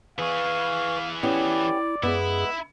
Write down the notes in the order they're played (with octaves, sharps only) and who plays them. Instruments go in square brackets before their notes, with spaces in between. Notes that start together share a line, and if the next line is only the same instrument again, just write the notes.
[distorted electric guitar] E3 G#4 [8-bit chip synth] B4 C#6 [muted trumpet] F5
[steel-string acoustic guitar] B3 C#4 G4 [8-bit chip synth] E4 [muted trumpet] D5
[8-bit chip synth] F#2 G#4 [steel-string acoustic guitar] G#3 B3 [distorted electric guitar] E4